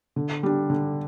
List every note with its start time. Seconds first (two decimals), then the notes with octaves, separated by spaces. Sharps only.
0.16 D3
0.43 G3 D4
0.70 D3